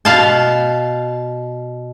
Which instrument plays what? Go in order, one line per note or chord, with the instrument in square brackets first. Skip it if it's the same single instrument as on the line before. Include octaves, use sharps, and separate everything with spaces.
[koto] B2 F5 A5